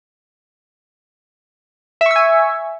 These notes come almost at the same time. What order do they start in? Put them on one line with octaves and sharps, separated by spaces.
E5 C#6 E6 G#5